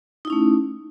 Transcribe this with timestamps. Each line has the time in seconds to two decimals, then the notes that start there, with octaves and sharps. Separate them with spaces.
0.25 D#4
0.27 E4
0.30 C#4
0.32 A3